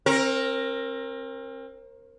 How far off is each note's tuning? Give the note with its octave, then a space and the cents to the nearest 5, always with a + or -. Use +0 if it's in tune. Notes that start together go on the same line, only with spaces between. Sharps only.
C4 +35 A#4 +0